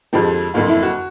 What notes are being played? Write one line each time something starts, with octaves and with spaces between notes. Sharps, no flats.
F2 D3 F3 G#3 G4
F#1 F2 D3 F4
E4
F#4